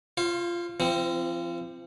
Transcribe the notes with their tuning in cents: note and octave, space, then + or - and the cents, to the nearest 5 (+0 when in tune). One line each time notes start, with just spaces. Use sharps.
F4 -15 C5 +40
F3 -35 C4 +0